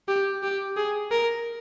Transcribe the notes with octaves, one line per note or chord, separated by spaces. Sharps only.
G4
G4
G#4
A#4